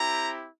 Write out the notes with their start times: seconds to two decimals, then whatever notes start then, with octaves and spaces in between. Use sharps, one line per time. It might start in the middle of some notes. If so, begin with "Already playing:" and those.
Already playing: C4 E4 G4 A#5